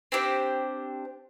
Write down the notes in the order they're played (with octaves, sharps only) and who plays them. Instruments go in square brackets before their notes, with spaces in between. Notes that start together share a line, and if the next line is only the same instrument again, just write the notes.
[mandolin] C4 D4 G4 C5